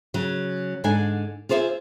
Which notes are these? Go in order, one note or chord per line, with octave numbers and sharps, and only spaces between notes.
C#3 F#3
G#2 D3 D4 G#5
F4 G#4 C5 D5 E5